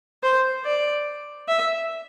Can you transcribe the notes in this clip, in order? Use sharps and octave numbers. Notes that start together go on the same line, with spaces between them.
C5
D5
E5